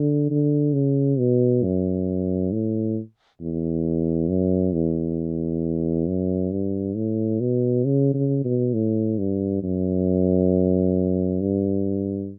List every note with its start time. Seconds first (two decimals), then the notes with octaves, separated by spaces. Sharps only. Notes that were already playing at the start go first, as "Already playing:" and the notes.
Already playing: D3
0.30 D3
0.74 C#3
1.19 B2
1.63 F#2
2.52 A2
3.41 E2
4.29 F#2
4.74 E2
6.07 F#2
6.52 G2
6.96 A2
7.40 B2
7.85 C#3
8.14 C#3
8.45 B2
8.74 A2
9.18 G2
9.63 F#2
11.41 G2